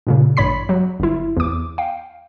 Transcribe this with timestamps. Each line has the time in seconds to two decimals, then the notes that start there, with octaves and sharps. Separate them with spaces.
0.07 G2 A#2 C#3
0.37 A1 G2 C#5 B5 B6
0.69 F#3
1.00 G1 E4
1.37 E2 D6
1.78 F5 G5